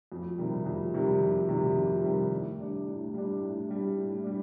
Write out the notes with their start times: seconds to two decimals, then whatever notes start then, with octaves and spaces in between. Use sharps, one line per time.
0.12 F2
0.38 C3 D#3 G3
0.66 F2
0.94 C3 D#3 G3
1.21 F2
1.48 C3 D#3 G3
1.76 F2
2.04 C3 D#3 G3
2.31 A2
2.59 G3 D4
2.86 A2
3.14 G3 D4
3.41 A2
3.69 G3 D4
3.96 A2
4.24 G3 D4